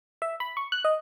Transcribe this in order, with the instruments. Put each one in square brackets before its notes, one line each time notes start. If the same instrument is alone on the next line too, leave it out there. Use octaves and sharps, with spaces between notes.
[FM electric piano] E5
B5
C#6
F#6
D#5